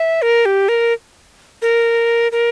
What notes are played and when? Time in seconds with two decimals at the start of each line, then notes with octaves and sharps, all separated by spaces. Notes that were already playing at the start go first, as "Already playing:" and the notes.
Already playing: E5
0.22 A#4
0.45 G4
0.69 A#4
1.62 A#4
2.32 A#4